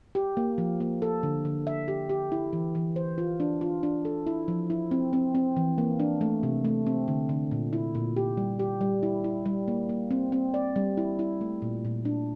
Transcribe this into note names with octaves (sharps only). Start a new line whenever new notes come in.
G4
A#3
F3
A#3
A4
D3
D3
E5
G4
G4
E4
E3
E3
C5
F4
D4
F4
D4
A4
E4
F3
E4
C4
C4
C4
E3
A#3
D4
A3
C3
A3
C4
D3
D3
A#2
E4
A#2
G4
G3
G4
G3
E4
E4
G3
A#3
A#3
C4
C4
D5
G3
E4
E4
A3
A#2
A#2
D4